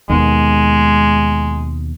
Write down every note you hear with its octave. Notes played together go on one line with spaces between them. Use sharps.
D#2 B2 G#3